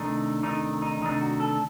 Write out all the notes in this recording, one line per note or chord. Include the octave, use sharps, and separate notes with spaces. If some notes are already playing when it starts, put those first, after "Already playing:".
Already playing: C3 D#3 A3 D4 D#4
C3 D#3 A3 D4 D#4
D#4
C3 D#3 A3 D4 D#4
F#4
A4